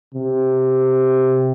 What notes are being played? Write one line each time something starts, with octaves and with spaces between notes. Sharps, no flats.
C3